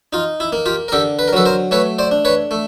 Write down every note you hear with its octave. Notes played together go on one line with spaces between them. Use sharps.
D#4 F4
E4
A#3
F4 G4
A#4
D3 G4 A4
B4
A#4
F#3 A4 B4
A#4 C5
A3 B4 C#5
C5 D5
D4
B4 C#5
A3